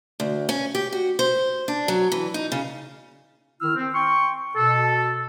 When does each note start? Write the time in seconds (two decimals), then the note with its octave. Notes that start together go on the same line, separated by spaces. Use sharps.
0.20 D2
0.49 C#4
0.75 G4
0.93 F#4
1.19 C5
1.68 D4
1.88 F#3
2.12 E3
2.34 D#4
2.52 C#3
3.61 D#3 E4 E6 F6
3.76 C4
3.95 G5 C6 C#6
4.55 B2 A4